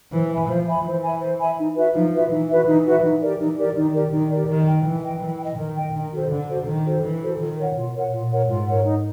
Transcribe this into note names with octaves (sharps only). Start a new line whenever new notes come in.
E3 C5
E5 G#5 B5
F3 C5
E5 G#5 B5
E3 C5
E5 G#5 B5
C5
E5 G#5 B5
D#4
F#4 B4 E5
F3 D#4
F#4 B4 E5
E3 D#4
F#4 B4 E5
E3 D#4
F#4 B4 E5
E3 D#4
G4 A#4 D5
E3 D#4
G4 A#4 D5
D#3 D#4
G4 A#4 D5
D#3 D#4
G4 A#4 D5
D#3 A#4
D#5 G5
E3 A#4
D#5 G5
E3 A#4
G5
D#5
D#3 A#4
D#5 G5
D#3 D4
F#4 A4 C5
D3 D4
F#4 A4 C5
D#3 D4
F#4 A4 C5
E3 D4
F#4 A4 C5
D#3 F4
A#4 C#5 F#5
B2 F4
A#4 C#5 F#5
A#2 F4
A#4 C#5 F#5
G#2 F4
A#4 C#5 F#5
D#4